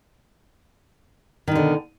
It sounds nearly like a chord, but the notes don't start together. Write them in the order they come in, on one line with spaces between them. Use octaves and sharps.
D#3 B2 D3